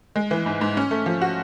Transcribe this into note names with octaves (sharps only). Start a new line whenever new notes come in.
G#3
E3
G#2
G#2
C#4
A3
F3
F#4